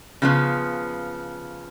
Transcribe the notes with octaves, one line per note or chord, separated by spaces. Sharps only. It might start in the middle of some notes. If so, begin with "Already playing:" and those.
C#3 F3 B3